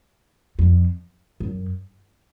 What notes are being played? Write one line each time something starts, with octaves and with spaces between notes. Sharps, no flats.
F2
F#2